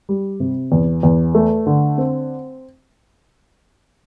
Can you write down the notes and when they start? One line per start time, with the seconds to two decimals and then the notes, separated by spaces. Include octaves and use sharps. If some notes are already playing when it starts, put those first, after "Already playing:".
0.09 G3
0.40 C3
0.72 E2
1.03 E2
1.35 A3
1.67 D3
1.98 C4